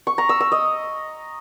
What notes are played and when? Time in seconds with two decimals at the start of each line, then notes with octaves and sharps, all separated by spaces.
0.07 C#6
0.18 A#5
0.29 E6
0.40 E6
0.52 D#5